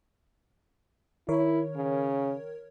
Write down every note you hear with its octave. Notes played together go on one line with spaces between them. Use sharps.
D#3 E4 A#4 C#5
C#3